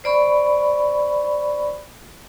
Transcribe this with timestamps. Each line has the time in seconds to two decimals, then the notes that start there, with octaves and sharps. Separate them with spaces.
0.04 C5 D5 B5 C#6